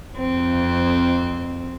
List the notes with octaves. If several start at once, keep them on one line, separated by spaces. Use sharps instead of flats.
F2 C4